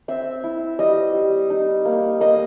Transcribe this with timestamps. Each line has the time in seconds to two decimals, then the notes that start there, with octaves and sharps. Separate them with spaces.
0.08 C4 E5
0.44 E4
0.79 G3 D#5
1.15 G3
1.50 D#4
1.85 A#3
2.20 A#3 D#5